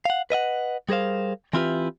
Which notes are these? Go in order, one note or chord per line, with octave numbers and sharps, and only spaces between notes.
F5 F#5
B4 D#5 E5 F#5
G3 G#4 A#4 C5 F5
E3 C4 E4 F4 G4 B4